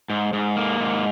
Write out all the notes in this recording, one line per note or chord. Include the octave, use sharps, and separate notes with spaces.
G#2
G#2
A#3
G#2